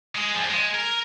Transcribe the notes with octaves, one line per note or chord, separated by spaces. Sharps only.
G#3 G#4
G2 F3
G#3
A#4